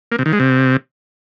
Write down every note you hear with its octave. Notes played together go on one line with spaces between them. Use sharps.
A#3
C3
D#3
G#3
C3